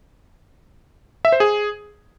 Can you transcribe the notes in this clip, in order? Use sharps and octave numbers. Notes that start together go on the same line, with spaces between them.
E5
C5
G#4